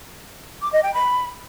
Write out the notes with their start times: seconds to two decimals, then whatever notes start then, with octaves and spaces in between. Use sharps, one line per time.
0.62 D6
0.73 D#5
0.83 G5
0.94 B5